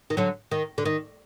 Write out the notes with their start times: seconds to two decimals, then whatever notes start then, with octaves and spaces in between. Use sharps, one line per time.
0.10 D#3
0.17 D3 F#3
0.51 D#3
0.78 D3
0.86 D#3